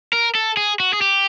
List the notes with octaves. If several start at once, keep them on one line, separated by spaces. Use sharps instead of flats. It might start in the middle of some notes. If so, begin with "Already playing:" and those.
A#4
A4
G#4
F#4
G#4
G4